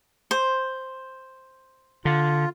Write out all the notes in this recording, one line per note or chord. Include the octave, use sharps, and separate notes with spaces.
C5
D3 F4